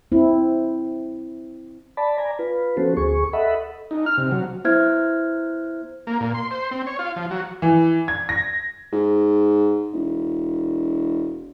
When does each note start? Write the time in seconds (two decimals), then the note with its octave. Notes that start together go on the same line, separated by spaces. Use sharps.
0.12 C4 E4
1.97 D5 A5 B5
2.18 D5 G#5 A#5
2.39 F4 B4
2.77 F3 B3 C#4 F#4 A4 C5
2.97 D2 G#4 C#6
3.33 A4 D#5 E5 F#5 B5
3.91 D#4
4.06 F6
4.18 C3
4.32 F#3
4.64 B3 E4 C5 E5 F6 G#6
6.07 A#3
6.20 A#2
6.34 C6
6.51 C5
6.71 C4
6.87 C#5
6.99 F4
7.16 F3
7.31 F#3
7.62 E3
8.08 G#6
8.29 A#6
8.93 G#2
9.93 E1